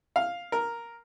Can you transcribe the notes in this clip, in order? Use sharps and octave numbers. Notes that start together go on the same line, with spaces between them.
F5
A#4